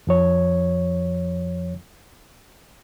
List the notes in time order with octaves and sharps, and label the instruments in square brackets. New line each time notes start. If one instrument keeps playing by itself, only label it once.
[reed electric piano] F2 F3 C#5